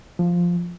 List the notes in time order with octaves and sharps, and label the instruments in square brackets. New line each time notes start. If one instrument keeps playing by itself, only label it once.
[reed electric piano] F3